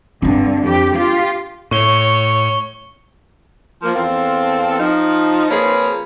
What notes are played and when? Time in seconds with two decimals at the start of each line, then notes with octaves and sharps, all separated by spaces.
0.22 G2 D3 C4 D4
0.64 F2 G4
0.94 F4 G4
1.71 A2 C#5 C#6 G7
3.83 F3 A#3
3.95 E2 C4 A4 C5 F5
4.79 F3 D#4
5.51 F3 A#3 C4 G#4 B4 C#5